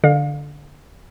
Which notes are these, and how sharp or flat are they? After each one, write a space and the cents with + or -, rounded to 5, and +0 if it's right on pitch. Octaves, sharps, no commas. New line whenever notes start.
D3 -5 D5 +40 F5 +30